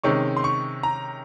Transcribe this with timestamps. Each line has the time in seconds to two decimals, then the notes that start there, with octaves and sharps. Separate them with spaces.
0.03 C3 D#3 G#3 C#4 C#6
0.37 C6
0.44 C#6
0.83 A#5